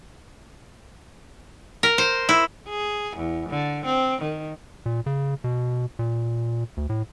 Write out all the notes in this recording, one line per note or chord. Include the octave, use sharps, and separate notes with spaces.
A#4
C5
E4
G#4
E2
D3
C4
D#3
A#2
C#3
B2
A#2
D2
A2